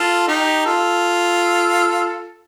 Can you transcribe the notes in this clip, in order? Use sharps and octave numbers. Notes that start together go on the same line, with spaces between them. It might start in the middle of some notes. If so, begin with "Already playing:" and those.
Already playing: F4 A4
D#4 G4
F4 A4